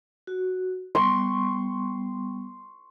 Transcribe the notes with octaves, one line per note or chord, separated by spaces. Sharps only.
F#4
G3 B3 C6 C#6